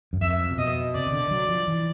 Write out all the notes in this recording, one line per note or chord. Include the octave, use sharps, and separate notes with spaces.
F#2
F2 E5
C3
B2 D#5
C3 D5
C#3
D3
F#3
F3
E3